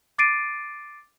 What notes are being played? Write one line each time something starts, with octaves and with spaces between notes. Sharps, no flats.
D6 A6 C7 D7 D#7